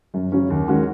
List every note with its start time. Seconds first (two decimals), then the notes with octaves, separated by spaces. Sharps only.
0.14 F#2
0.32 C#3 F#3 C#4
0.50 D#2
0.68 D#3 G#3 C#4 F#4